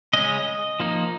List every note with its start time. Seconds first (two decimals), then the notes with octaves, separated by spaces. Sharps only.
0.13 C#3 G#3 C#4 D#5
0.80 F3 A#3 D#4